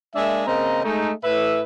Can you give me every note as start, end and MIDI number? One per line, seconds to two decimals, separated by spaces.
0.15 0.47 56
0.15 0.47 58
0.15 0.47 62
0.15 0.47 76
0.47 0.81 49
0.47 0.81 58
0.47 0.81 60
0.47 0.81 75
0.47 0.81 82
0.84 1.11 56
0.84 1.11 57
0.84 1.11 63
1.24 1.62 45
1.24 1.62 71
1.24 1.62 76